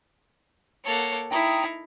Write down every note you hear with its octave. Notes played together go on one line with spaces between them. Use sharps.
A#3 A4 C#5 F#5
D#4 E4 G5 A#5 D#6